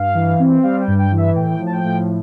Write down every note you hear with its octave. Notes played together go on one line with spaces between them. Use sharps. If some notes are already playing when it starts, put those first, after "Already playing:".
Already playing: G2 F5
E3
C4
G3 F5
G5
G2
G5
E3
E5
A2 G5
F3
A5
G5
A2